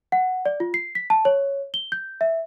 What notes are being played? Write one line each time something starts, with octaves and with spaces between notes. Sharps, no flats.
F#5
D5
F4
C7
B6
A5
C#5
G7
G6
E5